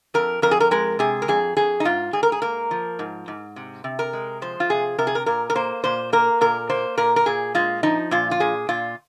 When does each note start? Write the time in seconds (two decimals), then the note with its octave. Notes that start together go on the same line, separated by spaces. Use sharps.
0.14 F2 A#4
0.42 F2 A#4
0.51 G#4
0.60 A#4
0.71 G#3 A#4
0.99 C3 G#4
1.22 A#4
1.28 F2 G#4
1.57 F2 G#4
1.80 D#4
1.85 G#2 F4
2.13 G#2 G#4
2.23 A#4
2.32 G#4
2.42 A#3 A#4
2.71 F3
2.99 G#2
3.28 G#2
3.56 C3
3.84 C3
3.99 A#4
4.13 G#3
4.42 F3 C5
4.60 F4
4.70 C3 G#4
4.98 C3 A#4
5.07 G#4
5.15 A#4
5.26 A#2 A#4
5.50 A#4
5.55 A#3 C5
5.84 A#2 C5
6.13 A#3 A#4
6.41 A#2 A#4
6.69 A#3 C5
6.98 A#2 A#4
7.16 A#4
7.26 A#2 G#4
7.55 G#3 F4
7.83 F3 D#4
8.11 A#2 F4
8.31 F4
8.40 A#2 G#4
8.69 A#2 F4